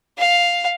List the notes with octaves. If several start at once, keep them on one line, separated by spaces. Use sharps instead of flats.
F5